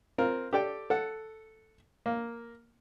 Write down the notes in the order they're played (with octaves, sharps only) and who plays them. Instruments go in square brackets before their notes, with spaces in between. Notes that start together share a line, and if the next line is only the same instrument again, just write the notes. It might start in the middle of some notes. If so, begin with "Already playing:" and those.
[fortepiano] C4 F4 A#4
G4 A4 D5 G5
A4 F#5
A#3